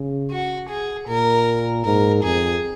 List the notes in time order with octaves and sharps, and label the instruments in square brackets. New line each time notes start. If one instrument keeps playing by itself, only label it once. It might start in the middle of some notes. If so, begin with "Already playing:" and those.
Already playing: [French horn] C#3
[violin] F#4
G#4
[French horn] A#2 [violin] A#4
[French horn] G#2 [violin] A#4
[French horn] F2 [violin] G#4